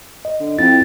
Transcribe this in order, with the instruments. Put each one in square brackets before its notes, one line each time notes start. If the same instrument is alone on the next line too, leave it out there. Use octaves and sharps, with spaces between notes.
[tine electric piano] D#5
[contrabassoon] D3
[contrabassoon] F2 [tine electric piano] E4 G5 [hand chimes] A6